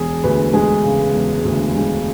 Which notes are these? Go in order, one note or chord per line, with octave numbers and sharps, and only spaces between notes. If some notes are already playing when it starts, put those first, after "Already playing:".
Already playing: E1 G#4
D2 B4
G#3 G#4
C#3
E1
D2
G#3